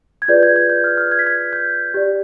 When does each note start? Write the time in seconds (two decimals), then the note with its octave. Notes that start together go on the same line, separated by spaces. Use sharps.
0.22 G#6
0.28 F4 G#4 B4 D5 G6
0.43 G#6
0.56 G#6
0.70 G6
0.84 F6
0.97 F6
1.12 G#6
1.19 B6
1.27 G#6
1.53 G6
1.94 G4 D5